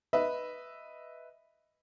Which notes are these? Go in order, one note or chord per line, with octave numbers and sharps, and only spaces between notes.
B4 D#5 E5